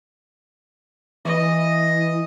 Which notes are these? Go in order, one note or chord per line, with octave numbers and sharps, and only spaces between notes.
E3 D#5